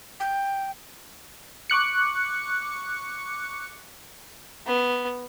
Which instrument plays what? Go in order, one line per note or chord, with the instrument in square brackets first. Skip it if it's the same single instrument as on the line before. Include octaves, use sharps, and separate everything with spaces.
[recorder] G5
[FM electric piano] C#6 D6 F#6 C#7
[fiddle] B3